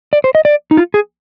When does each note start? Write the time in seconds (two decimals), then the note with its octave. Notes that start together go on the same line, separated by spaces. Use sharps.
0.13 D5
0.24 C5
0.35 D#5
0.45 D5
0.71 D#4
0.77 F4
0.94 G#4